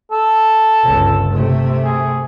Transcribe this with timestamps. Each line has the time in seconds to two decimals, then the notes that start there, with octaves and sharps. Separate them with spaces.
0.11 A4
0.83 G1 C#2
1.33 C3 A3
1.84 G#4